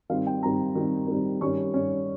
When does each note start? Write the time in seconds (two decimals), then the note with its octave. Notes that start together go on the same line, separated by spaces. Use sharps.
0.10 D#3 G3 C4 F5
0.26 G5
0.43 D#3 G3 C4 A#5
0.75 D#3 G3 C4
1.08 D#3 G3 C4
1.41 D#3 G3 C#4 C#6
1.74 D#3 G3 C#4